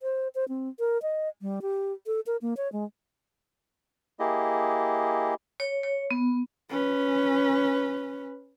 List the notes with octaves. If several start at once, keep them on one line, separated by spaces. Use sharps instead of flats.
C5
C5
C4
A#4
D#5
G3
G4
A4
A#4
A#3
C#5
G#3
A#3 E4 G4 G#4 D#5
C#5
C#5
B3
C#4 B4